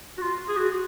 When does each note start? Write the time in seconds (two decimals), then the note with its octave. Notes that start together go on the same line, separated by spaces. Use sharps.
0.18 F#4
0.22 F4
0.48 G#4
0.57 F#4